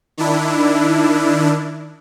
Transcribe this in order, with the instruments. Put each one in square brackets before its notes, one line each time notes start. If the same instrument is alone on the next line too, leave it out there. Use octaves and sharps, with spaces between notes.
[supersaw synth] D#3 D4 E4